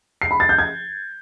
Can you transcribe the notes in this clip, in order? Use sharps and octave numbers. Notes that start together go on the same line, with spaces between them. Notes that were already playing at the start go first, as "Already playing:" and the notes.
C7
B5
A6
G6
G#6